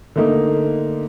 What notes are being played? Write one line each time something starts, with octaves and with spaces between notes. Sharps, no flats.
D3 A3 A#3 D#4